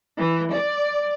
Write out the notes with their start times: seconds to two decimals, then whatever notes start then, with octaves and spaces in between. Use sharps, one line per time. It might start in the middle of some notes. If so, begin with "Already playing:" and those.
0.18 E3
0.54 D5